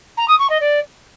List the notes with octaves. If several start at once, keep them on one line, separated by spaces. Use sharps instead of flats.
A#5
D#6
C#6
D#5
D5